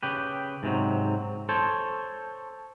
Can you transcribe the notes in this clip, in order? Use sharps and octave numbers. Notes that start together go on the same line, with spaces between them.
C#3 G4 B4
G#2 C3 F#3
A4 C5 C#5